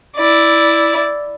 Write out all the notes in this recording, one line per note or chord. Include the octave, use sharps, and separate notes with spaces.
E4 D5